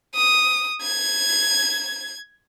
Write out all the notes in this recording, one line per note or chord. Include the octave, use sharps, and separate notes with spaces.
D#6
G#6